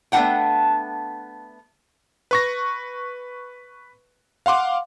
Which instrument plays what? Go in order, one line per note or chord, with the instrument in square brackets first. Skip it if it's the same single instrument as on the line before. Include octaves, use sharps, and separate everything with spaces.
[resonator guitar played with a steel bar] A3 B3 D4 D#4 F#5 G5
[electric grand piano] B4 C#6 A#6
F5 F#5 C6 D6